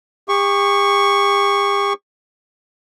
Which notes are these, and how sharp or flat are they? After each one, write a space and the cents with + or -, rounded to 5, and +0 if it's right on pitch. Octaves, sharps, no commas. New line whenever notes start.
G4 +40 C#6 +0